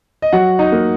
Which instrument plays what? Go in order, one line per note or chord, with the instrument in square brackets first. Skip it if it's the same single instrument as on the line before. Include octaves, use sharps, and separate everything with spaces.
[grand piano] D#5
[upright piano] F#3 [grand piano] F#4 F#5
[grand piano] D#4 D#5
[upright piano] A#3